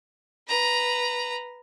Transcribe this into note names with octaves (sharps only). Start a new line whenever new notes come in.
B4 A#5